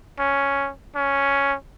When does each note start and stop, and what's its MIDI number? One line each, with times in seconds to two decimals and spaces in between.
0.19 0.70 61
0.95 1.55 61